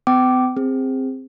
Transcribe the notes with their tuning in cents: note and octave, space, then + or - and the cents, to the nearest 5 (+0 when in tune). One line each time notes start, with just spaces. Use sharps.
B3 +45 G5 -35 D6 +0
C4 +0 G#4 -30